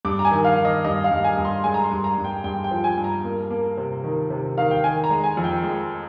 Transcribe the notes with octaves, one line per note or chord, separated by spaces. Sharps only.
G2 D6
A#5
G#5
D#3
F5
D#3
D#5
G2 D#5
F5
G2
G#5
G2
C6
G#3 G#5
A#5
C6
G2
A#5
G2
G5
G2 G5
G5
F3
G#5
G2
A#5
A#3
A#3
C3
D#3
C3
D#3 F5
G5
D#3 G#5
A#5
G#3
G#5
F2
G5
G#3